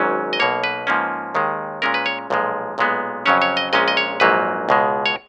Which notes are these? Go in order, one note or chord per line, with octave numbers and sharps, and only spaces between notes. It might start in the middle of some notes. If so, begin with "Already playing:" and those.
Already playing: G#1 G#2 F#3 C#4
D#5
B1 B2 A#3 C#5
B4
G#2 F3 A#3 C#4
D#2 D#3 G#3
A#2 G#3 C#4 A#4
B4
C#5
B1 A#2 F3 G#3
B1 A#2 G#3 B3
F2 C#3 F#3 C#4 C#5
C#5
D#5
A#1 A#2 G#3 C#4 D#5
D#5
C#5
A#1 G#2 F#3 A#3 B4
C#2 B2 G#3
C#5